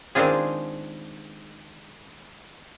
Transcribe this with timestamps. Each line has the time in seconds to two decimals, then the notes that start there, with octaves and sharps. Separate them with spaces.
0.15 D#3 G#3 C4 D4 F4 G#4